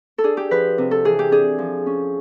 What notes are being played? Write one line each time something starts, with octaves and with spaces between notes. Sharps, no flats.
A4
D4 G#4
G4
F3 B4
C3
A4
E3 G#4
G4
D4 G#4
F3
C#4